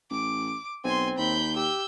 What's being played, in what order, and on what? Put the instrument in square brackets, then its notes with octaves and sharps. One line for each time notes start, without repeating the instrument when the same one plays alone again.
[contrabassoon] A1 [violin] D6
[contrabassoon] B1 [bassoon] C4 [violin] G#5 C6
[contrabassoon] D#2 [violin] B5 G6
[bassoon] G4 [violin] E6 G6